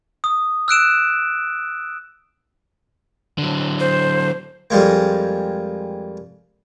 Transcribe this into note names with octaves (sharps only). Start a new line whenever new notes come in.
D#6
E6 F#6 D7 E7
D3 F#3
C5
F2 G3 G#3 A#3